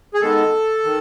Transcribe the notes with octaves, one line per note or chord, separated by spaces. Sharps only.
G#4
D#3 G#3 B3 A4
D#3